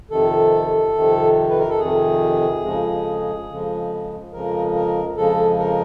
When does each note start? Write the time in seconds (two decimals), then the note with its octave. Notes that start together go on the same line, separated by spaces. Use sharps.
0.10 F2 C3 D#3 A4
0.95 F2 C3 D#3
1.50 B4
1.59 A#4
1.70 A4
1.79 F2 C3 D#3 G#4
2.64 F2 C#3 F3 G#3
3.49 F2 C#3 F3 G#3
4.32 F2 C#3 F3 G#3 A#4
4.75 A#4
5.17 F2 C#3 F3 G#3 A4
5.59 A#4